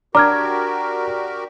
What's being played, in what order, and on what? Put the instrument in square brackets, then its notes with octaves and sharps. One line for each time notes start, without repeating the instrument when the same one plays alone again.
[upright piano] D4 [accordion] F#4 G4 A#4 [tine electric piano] A#5 [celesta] D6 F6 G#6